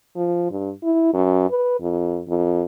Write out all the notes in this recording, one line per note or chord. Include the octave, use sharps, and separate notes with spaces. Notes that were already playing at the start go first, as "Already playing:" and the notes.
F3
G2
E4
F#2
B4
F2
F2